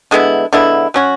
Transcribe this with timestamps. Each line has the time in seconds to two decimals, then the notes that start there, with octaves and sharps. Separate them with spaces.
0.11 D3 G#3 B3 E4
0.53 D3 G#3 B3 E4
0.94 F#3 C#4 F#4